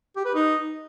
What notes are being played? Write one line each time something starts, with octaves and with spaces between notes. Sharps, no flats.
G4
B4
D#4